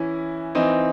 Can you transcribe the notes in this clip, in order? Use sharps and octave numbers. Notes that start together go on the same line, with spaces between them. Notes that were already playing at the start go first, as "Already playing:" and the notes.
Already playing: E3 C#4 E4
E3 C4 D#4